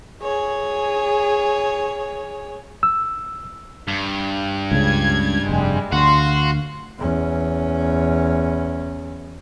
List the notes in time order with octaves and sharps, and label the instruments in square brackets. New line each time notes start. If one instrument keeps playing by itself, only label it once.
[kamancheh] G#4 C#5
[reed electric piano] E6
[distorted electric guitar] G2
[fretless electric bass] C#2 C#3 [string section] G#6
[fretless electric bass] F1 [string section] G3 G#3
[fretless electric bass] D2 [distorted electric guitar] F#4 [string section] F5 C6
[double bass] E2 C#4